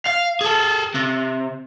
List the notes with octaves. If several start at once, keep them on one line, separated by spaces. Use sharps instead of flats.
F5
G#4 A4
C3